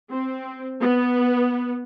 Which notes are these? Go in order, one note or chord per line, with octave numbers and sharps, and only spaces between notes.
C4
B3